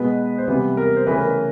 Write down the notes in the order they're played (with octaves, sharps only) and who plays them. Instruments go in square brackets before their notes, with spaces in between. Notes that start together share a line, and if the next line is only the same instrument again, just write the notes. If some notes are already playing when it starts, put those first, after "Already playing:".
Already playing: [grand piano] B2 G#3 B3 B4
C5
C3 E3 G3 B3 B4
A#4
C5
C#3 E3 A3 B4
A#4
B4